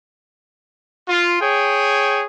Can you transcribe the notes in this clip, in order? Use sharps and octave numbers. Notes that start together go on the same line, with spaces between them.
F4
G#4 C#5 G5